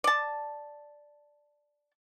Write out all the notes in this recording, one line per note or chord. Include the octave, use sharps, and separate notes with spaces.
D5 A5